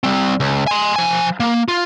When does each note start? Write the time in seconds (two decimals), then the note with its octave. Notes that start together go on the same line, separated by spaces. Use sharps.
0.04 G3 C4
0.40 C#2
0.67 G#5 C6
0.96 F3 G#5
1.40 A#3
1.68 F4